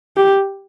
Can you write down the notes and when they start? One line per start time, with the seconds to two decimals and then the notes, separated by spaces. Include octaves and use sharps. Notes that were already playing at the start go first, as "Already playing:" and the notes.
0.17 G4